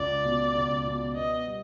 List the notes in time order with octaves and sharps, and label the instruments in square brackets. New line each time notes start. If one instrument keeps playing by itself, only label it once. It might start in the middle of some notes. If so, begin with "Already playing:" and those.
Already playing: [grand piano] C#2 [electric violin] D5
[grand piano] B2
C#2
B2
[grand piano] B3 [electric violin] D#5
[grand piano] G3